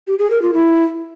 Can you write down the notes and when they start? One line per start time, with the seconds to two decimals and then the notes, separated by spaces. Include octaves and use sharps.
0.07 G4
0.19 G#4
0.30 A#4
0.42 F4
0.54 E4